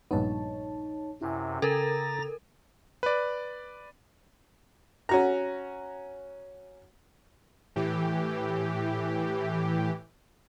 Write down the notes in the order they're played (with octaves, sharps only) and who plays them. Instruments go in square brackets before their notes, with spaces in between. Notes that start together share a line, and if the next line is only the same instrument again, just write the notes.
[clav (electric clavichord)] A#1 G2 B3 [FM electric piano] D#4 C#5 A5
[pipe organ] F#2 C3 [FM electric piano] E4 G#5
[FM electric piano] C#3 [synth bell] A4 A#4 [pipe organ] A#5 A6 A#6
[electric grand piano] B4 D5
[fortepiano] C#4 F#4 A#5
[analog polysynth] A2 E3 G4